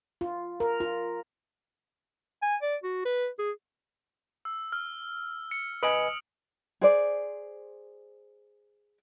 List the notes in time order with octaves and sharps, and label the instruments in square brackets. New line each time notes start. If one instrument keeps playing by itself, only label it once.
[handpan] F4
A#4
F4
[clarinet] G#5
D5
F#4
B4
G#4
[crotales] E6
F6
C#7
[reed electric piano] B4 D#5 G#5 [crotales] D#6 D7 F#7
[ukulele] G#4 C5 D5